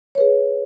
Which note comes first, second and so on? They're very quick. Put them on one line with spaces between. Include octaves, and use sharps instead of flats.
C#5 B4 G#4